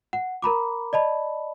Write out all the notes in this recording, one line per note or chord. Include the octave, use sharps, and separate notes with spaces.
F#5
A#4 A#5 B5 D6
D5 D#5 A5 B5